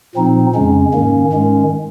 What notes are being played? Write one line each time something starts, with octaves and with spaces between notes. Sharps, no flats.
A#2 F3 C4 D#4
F2 C#3 G#3 C#4
G#2 D#3 A#3 C#4
G#2 D#3 G#3 C#4